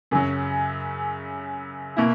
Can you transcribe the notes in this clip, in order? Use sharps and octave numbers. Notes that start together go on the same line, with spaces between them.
F#2 C#3 F#3
B2 A#3 E4